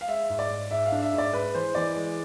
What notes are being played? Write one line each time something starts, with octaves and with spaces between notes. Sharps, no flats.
F5
G#3 E5
G#2
D5
G#2
G#2 E5
F5
D4
E5
G#2
D5
G#3 B4
E3 C5
E3 D5
G#3